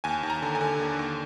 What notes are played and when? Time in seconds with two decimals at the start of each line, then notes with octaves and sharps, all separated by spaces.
0.04 D#2 G#5
0.23 D#2
0.30 A#5
0.42 D3
0.55 G#5
0.61 D3
0.80 D#2
0.99 D#2